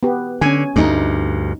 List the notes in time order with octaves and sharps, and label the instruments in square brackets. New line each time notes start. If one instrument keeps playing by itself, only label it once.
[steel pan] B3 G4
[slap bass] D3 [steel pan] C#4 G#5
[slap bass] D2 G2 [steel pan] A3 D#4